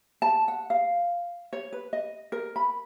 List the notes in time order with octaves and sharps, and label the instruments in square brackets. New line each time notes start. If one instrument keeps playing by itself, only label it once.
[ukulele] A5
F#5
F5
C#5
B4
D#5
A#4
B5